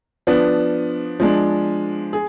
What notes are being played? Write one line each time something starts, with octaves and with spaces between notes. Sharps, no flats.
F3 B3 D4
F3 G#3 D4
G#4